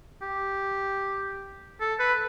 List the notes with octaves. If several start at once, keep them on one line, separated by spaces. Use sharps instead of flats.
G4
A4
B4